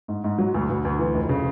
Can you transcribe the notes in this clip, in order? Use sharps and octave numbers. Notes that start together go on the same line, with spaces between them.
G#2
G#2
F#3
D2
D2
D2
E3
F1
C#3